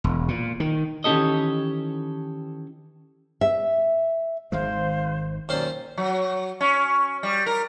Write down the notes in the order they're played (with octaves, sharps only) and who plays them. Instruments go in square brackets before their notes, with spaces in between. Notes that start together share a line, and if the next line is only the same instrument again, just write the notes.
[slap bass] E1
A#2
D#3
[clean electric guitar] D#3 E3 C#4 G4 A4 D#5
[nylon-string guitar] E5
[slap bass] G#1 D#3 G#3 [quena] C5 [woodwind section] F5
[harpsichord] D#2 C#4 C5 [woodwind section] B2 F#3 [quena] D5
[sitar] F#3
C#4
G3
A#4